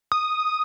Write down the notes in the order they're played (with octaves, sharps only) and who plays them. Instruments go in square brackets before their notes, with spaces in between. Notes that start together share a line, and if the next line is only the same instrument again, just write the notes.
[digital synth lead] D#6